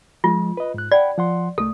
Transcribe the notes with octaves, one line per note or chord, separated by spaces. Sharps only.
F3 G#3 F4
B4 D#5
G#2 F#6
D5 F#5 G5 B5
F3 F#5 C6
C2 A3 A4